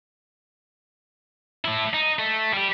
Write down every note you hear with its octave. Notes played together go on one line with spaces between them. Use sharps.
A3 E4
D#4
A3
G3 G4